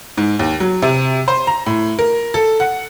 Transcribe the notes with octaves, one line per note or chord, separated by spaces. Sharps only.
G#2
D#2
F#3
C3
C5
A#5
A2
A#4
A4
F#5